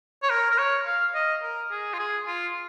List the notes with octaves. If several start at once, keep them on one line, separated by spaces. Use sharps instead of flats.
C#5
A#4
A#4
C#5
F5
D#5
A#4
G#4
F4
G#4
F4